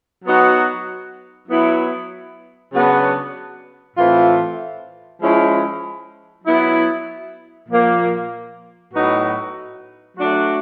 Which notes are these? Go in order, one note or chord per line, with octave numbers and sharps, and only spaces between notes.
F#3 B3 D#4 F#4
F#3 B3 E4
C#3 F#3 B3 D4
A2 E3 A3 C4 F4
F3 G#3 C#4 E4
F#3 B3 E4
A#2 F3 A#3
A2 F#3 B3 D#4 F#4
F#3 A3 D4 F#4